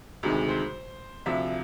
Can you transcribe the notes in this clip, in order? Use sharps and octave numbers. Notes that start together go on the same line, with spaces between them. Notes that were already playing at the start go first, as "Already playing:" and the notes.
D2 C3 D#3 G#3
C5
D2 C3 F3 E5